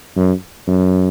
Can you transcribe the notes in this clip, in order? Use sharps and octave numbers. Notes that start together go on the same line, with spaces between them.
F#2
F#2